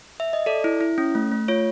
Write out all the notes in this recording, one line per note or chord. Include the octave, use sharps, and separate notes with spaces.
E5
D#5
A4 D5
E4
E4
C#4
A3
A3
F4 C#5